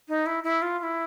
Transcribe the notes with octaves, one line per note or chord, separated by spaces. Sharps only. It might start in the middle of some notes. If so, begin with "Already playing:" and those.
D#4
E4
E4
F4
F4
E4